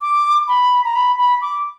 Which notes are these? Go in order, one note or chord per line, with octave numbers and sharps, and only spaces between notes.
D6
B5
A#5
B5
B5
D6